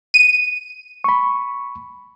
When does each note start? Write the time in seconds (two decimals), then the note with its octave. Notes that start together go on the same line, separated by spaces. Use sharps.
0.14 D#7
1.04 B5 C#6